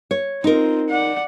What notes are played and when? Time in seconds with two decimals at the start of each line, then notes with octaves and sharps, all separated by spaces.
0.11 C#5
0.44 C4 D#4 F4 A#4
0.89 D5 F#5